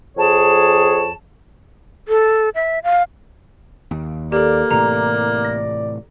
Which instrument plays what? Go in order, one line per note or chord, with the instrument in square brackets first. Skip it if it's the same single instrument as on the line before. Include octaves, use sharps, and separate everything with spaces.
[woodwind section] F2 G#4 C#5 A5
[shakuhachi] A4
E5
F5
[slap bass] D#2
[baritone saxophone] A#3 [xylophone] G4 A4 [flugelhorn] D5
[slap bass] A2 C3 E3 [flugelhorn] D5 [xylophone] A#5
[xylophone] A#6